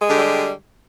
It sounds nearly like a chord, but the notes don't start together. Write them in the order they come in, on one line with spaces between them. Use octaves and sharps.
G#3 D3 G4 G3